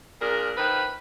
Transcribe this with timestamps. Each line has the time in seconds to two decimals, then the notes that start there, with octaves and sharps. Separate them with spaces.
0.21 A#2 D4 G#4 A#4
0.57 D#3 F3 B4